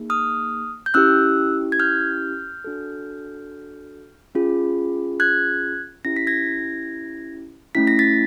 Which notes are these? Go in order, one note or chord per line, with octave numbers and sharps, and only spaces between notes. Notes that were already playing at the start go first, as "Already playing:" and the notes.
Already playing: A#3 D#4 G#4
D#6 F6
G6
C#4 E4 G4 E6 F#6
G#6
F6 G6
D4 F#4 A4
C#4 F4 G#4
F#6 G#6
C#4 E4 G4 A#6
B6
G#6 A#6
A3 C#4 E4 B6
A#6
A6 B6